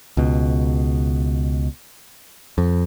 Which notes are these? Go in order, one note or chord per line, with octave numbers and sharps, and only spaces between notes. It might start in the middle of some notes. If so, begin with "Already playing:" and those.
C#2 B2
F2